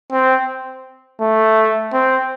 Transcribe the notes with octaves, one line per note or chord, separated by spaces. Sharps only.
C4
A3
C4